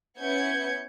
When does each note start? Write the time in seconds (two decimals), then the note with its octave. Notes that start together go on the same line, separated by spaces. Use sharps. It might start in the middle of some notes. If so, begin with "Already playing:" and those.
0.20 B3 C#4 E4 G6 G#6 C#7